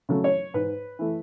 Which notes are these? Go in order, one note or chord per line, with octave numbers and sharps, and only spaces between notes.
C#3 F#3 A3
C#5
G#2 B4
E3 A3